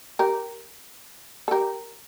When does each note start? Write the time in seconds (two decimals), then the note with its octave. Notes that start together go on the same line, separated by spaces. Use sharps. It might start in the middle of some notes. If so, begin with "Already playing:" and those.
0.19 G4 A#4
1.48 A4
1.51 G4 A#4